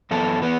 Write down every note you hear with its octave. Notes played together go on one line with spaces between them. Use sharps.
F#2 E3 B3 E4 A4
E3 B3